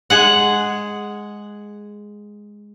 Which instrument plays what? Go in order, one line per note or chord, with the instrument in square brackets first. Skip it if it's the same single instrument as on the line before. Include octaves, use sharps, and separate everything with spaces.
[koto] G#3 G#4 F#5